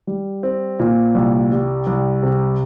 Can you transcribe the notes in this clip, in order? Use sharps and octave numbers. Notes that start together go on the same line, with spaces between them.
G3
C4
A#2
C2
G3
C2
C3